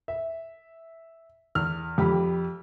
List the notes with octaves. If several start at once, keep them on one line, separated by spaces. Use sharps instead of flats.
E5
E2 F6
F2 G4 B5